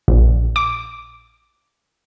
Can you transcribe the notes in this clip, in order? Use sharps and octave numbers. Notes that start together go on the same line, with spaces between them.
A#1
D6